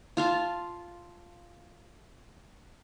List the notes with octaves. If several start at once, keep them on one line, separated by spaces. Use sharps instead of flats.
F4 F5 A5